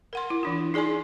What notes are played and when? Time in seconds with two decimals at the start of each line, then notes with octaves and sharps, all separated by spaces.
0.13 A#4 F#5 C6
0.30 E4
0.43 E3 D4 F4
0.74 D#4 G#4 D5 G#5 C6